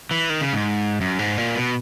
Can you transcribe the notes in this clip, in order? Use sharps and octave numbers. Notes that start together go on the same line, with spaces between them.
E3
D#3
C#3
G#2
F#2
G#2
A#2
B2